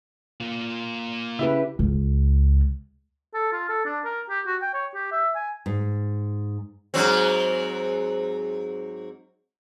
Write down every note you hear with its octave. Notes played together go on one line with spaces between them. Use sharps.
A#3 F4
C#3 E4 G4 B4
C#2
A4
F4
A4
D4
A#4
G4
F#4
G5
C#5
G4
E5
G#5
G#2
G#2 F#3 C4